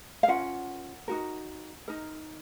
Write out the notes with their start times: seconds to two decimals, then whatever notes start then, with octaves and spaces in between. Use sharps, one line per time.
0.23 F5
0.28 C#4 F4 A#4 F#5
1.08 D#4 F#4 A#4
1.88 D#4 A#4